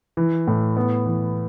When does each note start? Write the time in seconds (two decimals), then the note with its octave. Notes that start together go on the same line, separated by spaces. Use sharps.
0.17 E3
0.47 A2
0.77 B3
1.06 E3